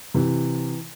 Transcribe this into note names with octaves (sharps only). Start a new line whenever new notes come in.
C3 E3